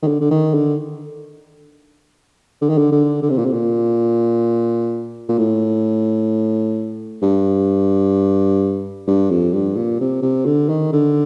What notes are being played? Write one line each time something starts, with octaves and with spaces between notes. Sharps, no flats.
D#3
D3
D3
D#3
D3
D3
D#3
D3
D3
D3
C3
A#2
C3
A#2
A#2
A2
G2
G2
F2
G2
A#2
C3
C3
D3
D#3
D3